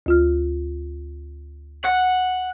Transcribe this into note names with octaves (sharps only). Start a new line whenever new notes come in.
D2 F4 F6
F#5